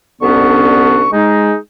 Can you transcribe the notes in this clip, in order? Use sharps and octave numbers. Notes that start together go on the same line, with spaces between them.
C2 D3 B3 C#4 D4 C#6
G#3 D#4